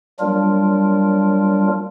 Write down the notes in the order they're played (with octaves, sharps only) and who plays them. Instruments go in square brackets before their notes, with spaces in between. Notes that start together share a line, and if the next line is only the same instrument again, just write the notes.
[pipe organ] F#3 G3 A#3 D4 F4 A#4